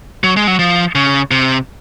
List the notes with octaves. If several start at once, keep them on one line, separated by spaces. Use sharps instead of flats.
F#3
G#3
F#3
F3
C#3
C3